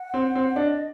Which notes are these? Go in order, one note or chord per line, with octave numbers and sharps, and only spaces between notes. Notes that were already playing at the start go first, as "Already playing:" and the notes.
Already playing: F#5
C4
C4
D4 D#5